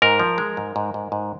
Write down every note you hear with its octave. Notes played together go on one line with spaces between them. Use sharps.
G#2 A#4
F3
G#3
G#2
G#2
G#2
G#2